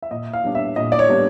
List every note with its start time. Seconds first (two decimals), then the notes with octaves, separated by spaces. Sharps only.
0.02 E5
0.11 A#2 D#5
0.33 F5
0.44 G3 B3 D4
0.55 E5
0.76 A#2 D#5
0.92 D5
0.99 C#5
1.09 G3 B3 D4